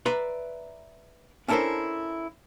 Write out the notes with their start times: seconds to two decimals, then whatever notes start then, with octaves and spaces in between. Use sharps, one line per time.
0.06 B4 D5 E5 A#5 C6
1.48 C#4 D4 E4 A4 A#4 C5